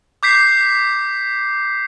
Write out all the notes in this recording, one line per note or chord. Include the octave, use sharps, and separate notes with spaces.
D6 G6 B6 C7